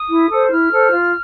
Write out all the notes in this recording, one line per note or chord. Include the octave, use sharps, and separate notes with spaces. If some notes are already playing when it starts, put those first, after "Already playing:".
Already playing: D#6
E4
A4 C5
E4 F6
A4 C5
F4